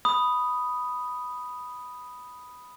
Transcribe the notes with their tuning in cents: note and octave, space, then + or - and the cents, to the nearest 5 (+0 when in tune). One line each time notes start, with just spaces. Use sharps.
B5 +0 D#6 +0